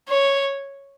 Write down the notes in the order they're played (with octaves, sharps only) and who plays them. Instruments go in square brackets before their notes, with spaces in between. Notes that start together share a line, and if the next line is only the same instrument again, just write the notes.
[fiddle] C#5